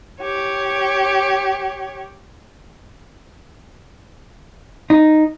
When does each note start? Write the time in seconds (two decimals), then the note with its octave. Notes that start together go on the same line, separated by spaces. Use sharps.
0.21 G4 C#5
4.90 D#4